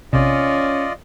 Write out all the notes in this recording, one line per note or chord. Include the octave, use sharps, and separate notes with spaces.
A#1 C3 C#4 F4 D5 D#5